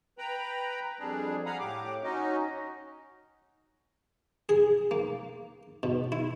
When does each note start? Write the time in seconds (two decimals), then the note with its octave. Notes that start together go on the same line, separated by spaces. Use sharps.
0.18 B4 G5 A#5 B5
0.99 F2 G3 D4 G#4
1.46 F5 F#5 G#5 A#5 B5 D#6
1.59 A2 G4 D6
2.03 C#4 D#4 F#4 D#5
4.49 G#4
4.91 A#3
5.83 B2
6.12 E4